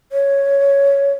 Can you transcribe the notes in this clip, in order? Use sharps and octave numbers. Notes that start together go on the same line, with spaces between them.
C#5